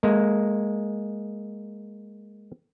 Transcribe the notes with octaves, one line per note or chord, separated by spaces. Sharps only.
G#3 A#3